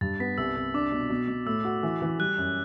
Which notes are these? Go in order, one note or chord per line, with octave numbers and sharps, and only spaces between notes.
G2 A6
B3 B6
C2 E6
C2
D4 D6
B2
B2
B2
A2 E6
F#4
E3
E3
G3 F#6
F#2